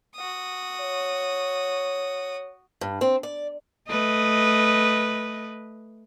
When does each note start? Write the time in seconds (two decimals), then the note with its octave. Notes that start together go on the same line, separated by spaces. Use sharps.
0.16 F#4 D#6
0.80 C#5
2.81 G2
3.01 C4
3.23 D5
3.89 A3 B4 D#5